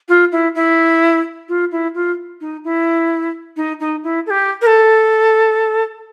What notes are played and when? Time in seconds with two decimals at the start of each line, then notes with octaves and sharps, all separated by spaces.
0.08 F4
0.32 E4
0.55 E4
1.48 F4
1.71 E4
1.94 F4
2.40 D#4
2.64 E4
3.56 D#4
3.80 D#4
4.03 E4
4.26 A4
4.30 G4
4.61 A#4
4.66 A4